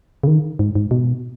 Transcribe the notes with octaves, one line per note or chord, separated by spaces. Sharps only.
C#3
D#3
G#2
G#2
B2